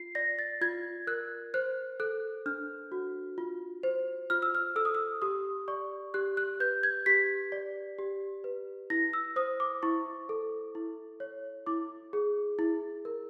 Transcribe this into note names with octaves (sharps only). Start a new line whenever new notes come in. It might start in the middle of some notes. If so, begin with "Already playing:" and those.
Already playing: F4 C7
D5 A#6
A6
F4 G#6
A#4 F#6
C5 F#6
A4 F#6
D4 F6
F#4
F4
C5
F4 F6
E6
F6
A4 E6
D#6
E6
G4 D#6
D5 C#6
G4 F#6
F#6
B4 G6
G#6
G4 B6
D5
G4
B4
E4 A#6
E6
C5 D#6
D6
E4 C#6
A4
E4
C#5
E4 D6
G#4
E4
A#4